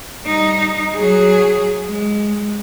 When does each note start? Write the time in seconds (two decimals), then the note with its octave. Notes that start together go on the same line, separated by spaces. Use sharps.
0.23 G3 D#4
0.95 F#3 G#4
1.87 G#3